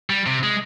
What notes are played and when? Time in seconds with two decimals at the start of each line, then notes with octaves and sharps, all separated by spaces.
0.10 G3
0.26 C3
0.43 G#3